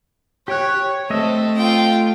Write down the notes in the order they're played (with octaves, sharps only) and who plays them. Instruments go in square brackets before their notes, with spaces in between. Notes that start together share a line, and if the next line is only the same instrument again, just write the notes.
[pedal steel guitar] G4 G5 F#6 [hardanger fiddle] C#5
[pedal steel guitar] A3 D#5 E5 [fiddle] C4 [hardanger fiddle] A4
[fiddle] F4 G5